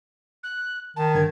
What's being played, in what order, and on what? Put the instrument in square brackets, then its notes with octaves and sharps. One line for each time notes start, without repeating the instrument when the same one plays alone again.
[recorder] F#6
[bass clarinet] D#3 [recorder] A5
[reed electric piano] G2 D3 A#4 [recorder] G#6